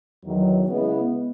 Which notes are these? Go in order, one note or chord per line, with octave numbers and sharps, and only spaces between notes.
E2 D#3 F#3
C#3 G#3 B3 E4